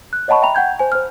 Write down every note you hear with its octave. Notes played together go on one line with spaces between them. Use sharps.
F#6
C#5 D#5 F#5 A5 B5 C#6
E5 G5 A#5 B5 F7
F#5 G5 G6 G#6
C5 G#5
C5 F6